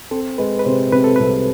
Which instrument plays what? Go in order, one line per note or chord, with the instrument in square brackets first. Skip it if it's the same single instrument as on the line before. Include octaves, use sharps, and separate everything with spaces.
[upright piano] C4 [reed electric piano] A4
[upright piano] G#3 [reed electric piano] B4
[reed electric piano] B4
[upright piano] C3 [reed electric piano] C5
[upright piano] C3 [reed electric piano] B4
[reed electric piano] A4
[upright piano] C2 [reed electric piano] B4